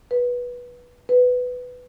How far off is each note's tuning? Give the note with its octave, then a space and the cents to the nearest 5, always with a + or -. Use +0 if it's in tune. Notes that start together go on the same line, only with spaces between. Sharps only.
B4 -15
B4 +10